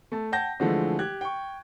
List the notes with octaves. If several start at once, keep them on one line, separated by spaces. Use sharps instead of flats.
A3 A5
F#5 G5 A5 G6 A#6
D3 E3 F3 G#3 A3
G4 F#6 G#6
G5 C#6